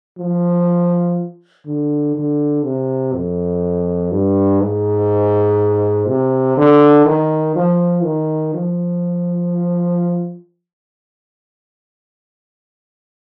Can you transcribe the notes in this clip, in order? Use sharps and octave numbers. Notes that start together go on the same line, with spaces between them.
F3
D3
D3
C3
F2
G2
G#2
C3
D3
D#3
F3
D#3
F3